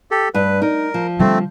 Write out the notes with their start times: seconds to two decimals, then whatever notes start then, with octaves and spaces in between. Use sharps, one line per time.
0.11 G4 A4
0.34 G2 B4
0.62 D#4 A#4
0.94 F3
1.19 D3 G3 A3 C4